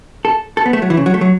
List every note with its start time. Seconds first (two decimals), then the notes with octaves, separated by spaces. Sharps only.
0.25 A4
0.57 A4
0.66 B3
0.73 A3
0.82 F#3
0.90 E3
0.97 C#3
1.06 F#3
1.14 A3
1.21 F#3